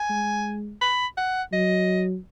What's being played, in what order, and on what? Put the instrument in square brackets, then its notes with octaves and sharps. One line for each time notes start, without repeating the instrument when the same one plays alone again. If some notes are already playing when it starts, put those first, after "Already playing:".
Already playing: [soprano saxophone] G#5
[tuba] G#3
[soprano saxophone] B5
F#5
[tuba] F#3 [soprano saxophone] D#5